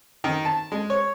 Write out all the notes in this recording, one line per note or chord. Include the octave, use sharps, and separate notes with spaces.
D#3
A5
G#3
C#5